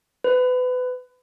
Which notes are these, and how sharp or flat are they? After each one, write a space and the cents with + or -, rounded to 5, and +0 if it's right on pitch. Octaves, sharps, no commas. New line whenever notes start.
B4 +30